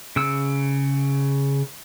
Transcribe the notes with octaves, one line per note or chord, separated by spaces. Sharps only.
C#3 E6